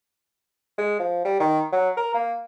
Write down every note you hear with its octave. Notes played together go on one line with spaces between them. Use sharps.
G#3
F3
G3
D#3
F#3
A#4
A#3